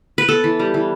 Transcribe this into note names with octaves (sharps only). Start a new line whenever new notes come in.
B4
B3 A4
E3
G3
E3